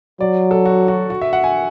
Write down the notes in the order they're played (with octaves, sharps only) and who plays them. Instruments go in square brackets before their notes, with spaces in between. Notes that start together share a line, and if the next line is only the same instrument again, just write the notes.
[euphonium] F#3 [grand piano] D5
[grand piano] A4
F#4
F#4
F#4
E5
F#5
G#5